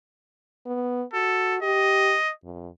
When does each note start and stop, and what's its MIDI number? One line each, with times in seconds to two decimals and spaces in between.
0.66 1.03 59
1.13 1.58 66
1.13 1.56 69
1.62 2.16 67
1.62 2.31 75
2.44 2.69 41